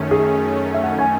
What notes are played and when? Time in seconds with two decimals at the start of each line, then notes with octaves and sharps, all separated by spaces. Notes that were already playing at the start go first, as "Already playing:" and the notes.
Already playing: F#2 D#3 A3 C#4
0.11 G#4
0.74 E5
0.84 F#5
0.98 G#5